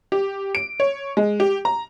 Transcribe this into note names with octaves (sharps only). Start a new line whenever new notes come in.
G4
D7
C#5
G#3
G4
A#5